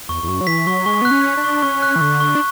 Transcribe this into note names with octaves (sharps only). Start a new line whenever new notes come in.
E2 C#6
E2
F#2 C#6
F#3
E3 B6
F#3 C#6
G#3 C#6
B3 F#6
C#4
F#6
D4
C#6
C#4 C#6
F#6
E3
D3 C#6
C#6
D4